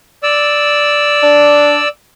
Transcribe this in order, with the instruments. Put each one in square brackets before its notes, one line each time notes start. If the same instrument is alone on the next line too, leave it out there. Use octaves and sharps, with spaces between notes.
[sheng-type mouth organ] D5 E6
[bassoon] D4